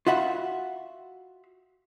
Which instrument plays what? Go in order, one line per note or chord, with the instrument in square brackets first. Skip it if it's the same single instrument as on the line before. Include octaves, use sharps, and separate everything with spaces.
[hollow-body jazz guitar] F4 F#4 E5 F#5 B5